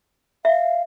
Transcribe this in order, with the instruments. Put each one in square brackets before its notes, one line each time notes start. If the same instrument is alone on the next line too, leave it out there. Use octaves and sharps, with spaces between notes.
[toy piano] E5 [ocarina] F5